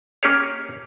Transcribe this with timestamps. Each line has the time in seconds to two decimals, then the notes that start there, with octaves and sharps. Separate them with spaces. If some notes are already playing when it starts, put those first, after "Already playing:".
0.23 A#3 C#4 G4 G#4 C#5